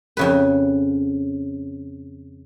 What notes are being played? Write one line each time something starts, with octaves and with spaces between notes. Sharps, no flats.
F2 C#3 B4